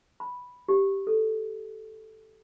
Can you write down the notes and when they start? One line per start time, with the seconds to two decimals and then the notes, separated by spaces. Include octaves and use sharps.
0.20 B5
0.69 G4
1.07 A4